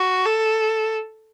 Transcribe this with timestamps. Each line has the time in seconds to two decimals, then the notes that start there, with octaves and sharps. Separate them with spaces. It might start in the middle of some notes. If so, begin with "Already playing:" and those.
Already playing: F#4
0.25 A4